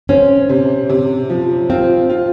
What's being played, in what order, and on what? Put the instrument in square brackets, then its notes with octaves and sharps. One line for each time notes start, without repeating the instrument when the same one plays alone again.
[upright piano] C4 [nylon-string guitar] C#4
[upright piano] C3
C3
F3
[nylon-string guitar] C4 [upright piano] F4
[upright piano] F4